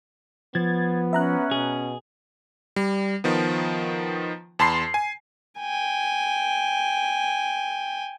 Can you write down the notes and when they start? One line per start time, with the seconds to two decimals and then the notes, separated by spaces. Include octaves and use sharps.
0.55 F3 B3 G#6 A6
1.13 C#4 E5 A#5 F#6
1.51 B2 G#4
2.76 G3
3.24 D#3 F3 B3
4.59 E2 A5 B5 C6 C7
4.94 G#5
5.59 G5 G#5